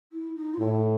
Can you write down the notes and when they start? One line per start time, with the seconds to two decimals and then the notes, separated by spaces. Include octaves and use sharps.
0.12 E4
0.35 D#4
0.53 F4
0.59 A2 E4